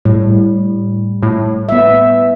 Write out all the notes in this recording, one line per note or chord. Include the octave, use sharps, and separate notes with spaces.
A2 G3
A2
B3 E5